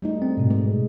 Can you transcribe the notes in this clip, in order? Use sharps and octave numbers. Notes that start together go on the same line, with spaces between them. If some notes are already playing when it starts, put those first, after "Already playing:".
G3 A3 D#4
C4
G#2 B2
G#3